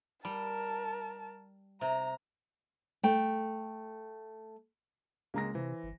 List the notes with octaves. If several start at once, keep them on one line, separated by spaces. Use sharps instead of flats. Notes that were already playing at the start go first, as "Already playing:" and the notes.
G3 A#4 A5
C3 A#5
A3 G5
C#2 G#3 A#3 A#5 A#6
C3 E3 C5
G1